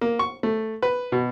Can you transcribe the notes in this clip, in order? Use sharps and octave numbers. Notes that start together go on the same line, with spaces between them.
A#3
C#6
A3
B4
B2